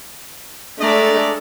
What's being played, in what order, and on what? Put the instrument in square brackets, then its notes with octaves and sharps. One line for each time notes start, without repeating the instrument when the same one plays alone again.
[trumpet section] G#3 D5 A#5 [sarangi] A3 [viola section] D4 A4